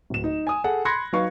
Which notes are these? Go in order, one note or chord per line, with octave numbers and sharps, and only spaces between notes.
D1 E7
D#4
G#5 D#6
G#4 A4 F#5
B5 C6 F#6 G#6 A#6 C#7
F#3 D#4 B4 F5 C#6